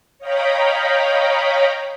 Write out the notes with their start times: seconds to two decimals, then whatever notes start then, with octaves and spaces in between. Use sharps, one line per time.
0.19 C#5 D#5 F5 G5 A#5 B5